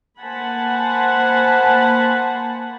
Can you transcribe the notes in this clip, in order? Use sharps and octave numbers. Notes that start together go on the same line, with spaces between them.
A#3 C5 F#5 G#5 A5 B5